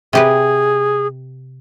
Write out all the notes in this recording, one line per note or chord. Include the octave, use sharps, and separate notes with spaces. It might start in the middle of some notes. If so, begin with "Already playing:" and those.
C3 G4 G#4 B4